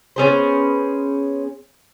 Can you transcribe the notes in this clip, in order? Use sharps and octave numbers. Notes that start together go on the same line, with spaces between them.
B3 C#4 G#4 C5